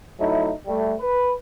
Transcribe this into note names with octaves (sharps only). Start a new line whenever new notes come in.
F#3 A3 D#4 E4
G3 A3
B4